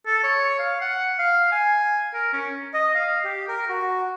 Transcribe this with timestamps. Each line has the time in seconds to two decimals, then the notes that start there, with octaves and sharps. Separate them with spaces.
0.06 A4
0.24 C#5
0.59 F5
0.81 F#5
1.19 F5
1.52 G#5
2.14 A#4
2.33 C#4
2.74 D#5
2.94 F5
3.24 G4
3.48 A#4
3.68 F#4